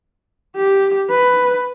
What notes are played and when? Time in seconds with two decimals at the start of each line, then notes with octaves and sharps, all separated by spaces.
0.57 G4
1.10 B4